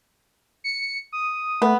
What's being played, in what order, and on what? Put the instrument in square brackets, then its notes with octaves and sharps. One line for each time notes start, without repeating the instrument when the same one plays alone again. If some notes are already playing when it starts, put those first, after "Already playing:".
[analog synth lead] C#7
D#6
[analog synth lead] A3 [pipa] B3